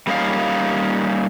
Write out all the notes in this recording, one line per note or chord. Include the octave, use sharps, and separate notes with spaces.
G3 A#3 C#4 D#4 F5